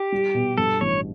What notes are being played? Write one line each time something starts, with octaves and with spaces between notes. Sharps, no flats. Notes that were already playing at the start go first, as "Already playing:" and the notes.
Already playing: G4
G3
B2
G2 A4
A1 C#5